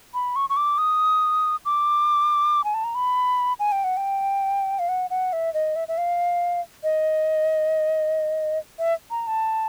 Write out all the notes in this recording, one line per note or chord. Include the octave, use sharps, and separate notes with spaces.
B5
C#6
C#6
D6
D#6
D6
G#5
A5
A#5
B5
G#5
G5
F#5
G5
F5
F#5
F#5
E5
D#5
E5
E5
F5
D#5
E5
A#5
A5